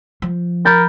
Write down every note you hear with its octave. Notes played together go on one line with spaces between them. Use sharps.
F3
A#4 B5 G6 A6